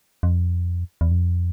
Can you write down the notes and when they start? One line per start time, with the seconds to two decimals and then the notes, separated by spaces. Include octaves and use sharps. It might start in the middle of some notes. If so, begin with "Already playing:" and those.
0.23 F2
1.01 E2
1.11 F2